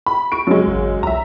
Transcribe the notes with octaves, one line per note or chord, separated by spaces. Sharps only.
B5
C#6 D7
F#2 C#3 G#3
G#1
B1 E5 A#5